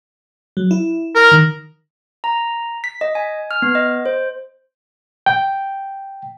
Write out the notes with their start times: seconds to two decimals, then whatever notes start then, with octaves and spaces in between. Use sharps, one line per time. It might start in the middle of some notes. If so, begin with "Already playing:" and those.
0.57 F#3
0.71 E4
1.15 A#4
1.31 D#3
2.24 A#5
2.84 B6
3.01 D#5
3.15 G#5
3.51 F6
3.62 B3
3.75 D#5
4.06 C5
5.26 G5